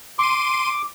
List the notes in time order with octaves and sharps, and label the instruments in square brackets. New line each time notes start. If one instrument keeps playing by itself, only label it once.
[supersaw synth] C6 D#7 [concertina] D6